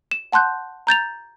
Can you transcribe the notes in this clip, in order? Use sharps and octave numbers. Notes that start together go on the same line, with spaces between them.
E7
F#5 A5 C6 F#6 G6
A#5 G6 A6 F7